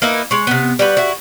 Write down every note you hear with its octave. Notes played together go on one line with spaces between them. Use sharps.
A#3 D#4 E4 B4
G#3 C#5
C3 B3
G3 F#4 B4
E4 F#4